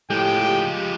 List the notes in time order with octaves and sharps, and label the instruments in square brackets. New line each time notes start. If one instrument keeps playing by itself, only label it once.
[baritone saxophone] A2 [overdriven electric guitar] F3 G#3 [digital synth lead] G4 [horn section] G5